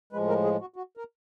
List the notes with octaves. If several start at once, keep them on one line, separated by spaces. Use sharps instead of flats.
A2 F3 G#3 B4
A#4
G#4
F#4
F#4
A#4